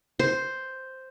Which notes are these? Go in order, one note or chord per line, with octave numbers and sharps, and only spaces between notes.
C5